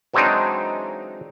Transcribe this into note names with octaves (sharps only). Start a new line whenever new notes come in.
E3 F#3 G#3 C4 D4 D#4